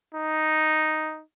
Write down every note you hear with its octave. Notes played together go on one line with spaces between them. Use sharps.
D#4